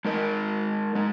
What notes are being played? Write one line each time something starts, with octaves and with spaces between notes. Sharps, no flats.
G#3 D#4 A#4 D#5
G#3 D#4